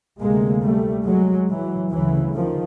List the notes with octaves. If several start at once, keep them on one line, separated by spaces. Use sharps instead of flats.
D2 C3 G#3 A#3
G3 A3
F#3 G#3
E3 F#3
D2 C#3 E3 F#3
D#3 F3